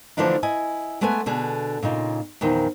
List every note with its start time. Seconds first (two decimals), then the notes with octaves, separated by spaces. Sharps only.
0.17 D3 E3 F3 A3 D4 D#4
0.43 E4 D#5 G#5
1.01 G#3 A3 B3 B4 F#5 G#5
1.26 B2 D3 G#4
1.83 A#2 C#3 D#4 F4
2.41 E2 A#2 D#3 F3